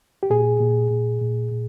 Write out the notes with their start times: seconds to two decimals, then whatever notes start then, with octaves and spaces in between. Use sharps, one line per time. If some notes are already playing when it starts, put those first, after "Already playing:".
0.23 G4
0.30 A#2 G#4
0.60 A#2
0.91 A#2
1.22 A#2
1.51 A#2